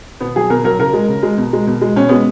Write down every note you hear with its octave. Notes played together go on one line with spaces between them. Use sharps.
B2 B3
F#3 G#4
B2 A#4
F#3 A#4
C#3 A#4
G#3
C#3
G#3
B2
G#3
B2
G#3
B2 C#4
G#3 B3